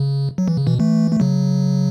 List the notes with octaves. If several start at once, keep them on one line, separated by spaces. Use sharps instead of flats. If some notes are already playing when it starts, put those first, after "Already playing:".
Already playing: C#3
F#3
E3
C#3
B2 E3
E3 A3
A3
C#3 F#3